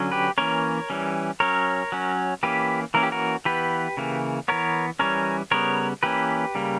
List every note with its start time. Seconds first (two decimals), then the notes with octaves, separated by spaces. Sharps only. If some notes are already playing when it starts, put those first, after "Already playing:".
Already playing: D3 F#3 C#4
0.12 G4 B4
0.38 E3 A#3 C#4 A#4 C#5
0.90 E3 G3 C#4
1.40 F#3 C#4 A#4 C#5
1.92 F#3 C#4
2.43 E3 A#3 C#4 G4 B4
2.94 E3 A#3 C#4 A#4
3.03 G4
3.12 F#4 A#4
3.45 E3 B3 G4 B4
3.97 C#3 E3 A#3
4.48 E3 B3 A#4 C#5
4.99 E3 G3 C#4 A#4 C#5
5.51 C#3 G3 B3 A#4 C#5
6.03 E3 A#3 C#4 G4 B4
6.55 C#3 G3 A#3